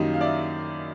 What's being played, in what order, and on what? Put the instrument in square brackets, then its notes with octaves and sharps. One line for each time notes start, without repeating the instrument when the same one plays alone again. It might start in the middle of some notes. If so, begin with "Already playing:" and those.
Already playing: [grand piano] F#2 D#3 G3 A#3 D#4
F5
D5 E5